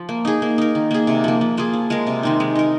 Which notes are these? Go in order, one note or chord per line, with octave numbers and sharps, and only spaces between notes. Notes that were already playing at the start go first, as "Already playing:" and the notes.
Already playing: F3
A#3
D#4 G#4
A#3
D#4 A#4
D#3
A#3 G#4
C3
F3 A#3
F3
A#3 F4 G#4
F3
G#3 F4 A#4
C3
D#3 C4 D#4
G#3
D#4 A#4